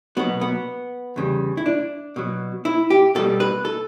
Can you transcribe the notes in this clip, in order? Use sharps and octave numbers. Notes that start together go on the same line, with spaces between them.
B2 F#3 B3
B3
E2 C#3 G3
E4
D4
B2 F#3
E4
G4
B2 G3 A4
B4
A4